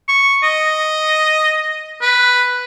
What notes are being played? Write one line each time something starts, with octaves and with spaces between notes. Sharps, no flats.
C#6
D#5
B4